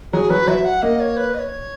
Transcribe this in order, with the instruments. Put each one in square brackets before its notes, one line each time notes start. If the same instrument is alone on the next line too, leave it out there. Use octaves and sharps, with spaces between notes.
[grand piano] F#3 [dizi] G#4
[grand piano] F#3 [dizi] B4
[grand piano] F#3 [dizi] E5
[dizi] F#5
[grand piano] A#3 [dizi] D#5
[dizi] C#5
B4
D#5
C#5